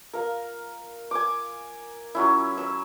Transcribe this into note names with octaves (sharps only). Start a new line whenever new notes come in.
A#4 F5
G#5 D6
F#3 C#4 E4
E6